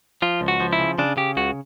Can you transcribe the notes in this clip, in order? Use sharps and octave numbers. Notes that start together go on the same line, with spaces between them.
F3 F4
C#2
F#4
F3
E4
C#3
C#3 D4
C#3 G4
C#2 F#4